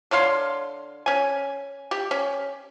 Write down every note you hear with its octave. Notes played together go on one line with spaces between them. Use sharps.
D3 C#5 F5 C6
C#4 G#5
G4
C#4